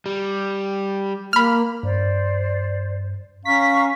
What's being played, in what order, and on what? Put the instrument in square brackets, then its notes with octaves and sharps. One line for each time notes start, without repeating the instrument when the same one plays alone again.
[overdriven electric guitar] G3
[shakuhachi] A#3 [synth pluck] B5 F6
[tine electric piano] G2 [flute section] C5 D5
[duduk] C#4 [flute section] F5 A#5 C#6 [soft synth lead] B6